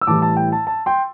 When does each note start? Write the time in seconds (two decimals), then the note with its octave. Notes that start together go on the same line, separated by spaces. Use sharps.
0.01 E6
0.07 A2 E3 G3 E4 A5 D6
0.22 A5
0.37 G5
0.52 A5
0.67 A5
0.86 G5 C6